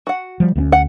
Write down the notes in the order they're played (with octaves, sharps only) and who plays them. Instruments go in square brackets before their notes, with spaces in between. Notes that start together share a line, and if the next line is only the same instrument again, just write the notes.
[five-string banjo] F#4 F#5
[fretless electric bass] F3 G3
D2 A#3 C#4
[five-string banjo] F#5